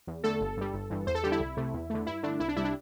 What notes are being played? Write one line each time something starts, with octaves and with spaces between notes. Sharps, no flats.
E2
D3 A3 A4
G1
G2 G3
G1
G2 E3
E2 C5
A4
D3 G3 G4
E4
C2
C3 A3
E2
D3 A3
G2 E4
D3 A3 D4
C2 E4
D4
C3 G3 E4
D4